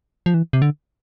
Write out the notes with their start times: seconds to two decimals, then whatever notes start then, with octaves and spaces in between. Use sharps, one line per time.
0.26 F3
0.34 E3
0.53 C3
0.62 D3